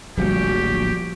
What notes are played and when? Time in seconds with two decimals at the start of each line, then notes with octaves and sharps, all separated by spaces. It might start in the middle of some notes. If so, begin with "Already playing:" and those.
0.17 D1 A#1 A#2 F3 G3 F#4 G4